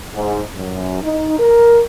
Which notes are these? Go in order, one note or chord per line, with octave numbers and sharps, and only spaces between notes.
G#2
F#2
D#4
A#4